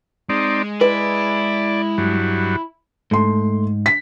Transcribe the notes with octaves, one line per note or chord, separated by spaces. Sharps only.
G#3 C4 D#4 D5
E4 B4 D5
G2 F#3
G#2 A3 C6
B6